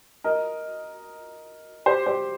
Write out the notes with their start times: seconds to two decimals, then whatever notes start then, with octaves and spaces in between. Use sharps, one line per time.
0.24 A#4 D#5
1.86 G4 C5
2.06 G4 C5